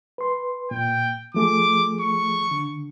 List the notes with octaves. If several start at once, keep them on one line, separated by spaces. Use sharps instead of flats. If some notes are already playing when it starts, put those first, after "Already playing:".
B4 C6
A#2 G5
F3 A3 G#4 D6
C#6
D3